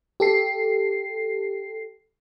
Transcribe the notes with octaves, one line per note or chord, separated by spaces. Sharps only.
G4 A4 C7